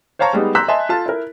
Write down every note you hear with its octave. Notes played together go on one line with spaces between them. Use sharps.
C5 C#5 F5 A5 A#5 C#6
G3 G#3 B3 D#4
A#5 C6 E6 F#6 G6 B6
D#5 E5 G#5 A5 C6
F4 A4 A5
E4 A#4